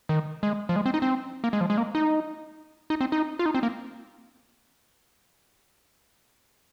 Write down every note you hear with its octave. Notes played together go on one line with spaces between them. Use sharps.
D#3
G#3
F3
G#3
C4
D#4
C4
A#3
G#3
F3
G#3
A#3
D#4
D#4
C4
D#4
F4
D#4
C4
A#3